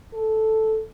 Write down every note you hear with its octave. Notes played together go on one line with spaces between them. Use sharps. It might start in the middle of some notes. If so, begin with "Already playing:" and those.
A4